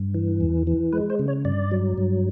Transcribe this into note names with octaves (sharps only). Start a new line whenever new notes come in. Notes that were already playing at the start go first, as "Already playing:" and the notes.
Already playing: G2
E3
E2
E3
G#3 B4
C5
C#3
C#5
G2 D5
F#3
G2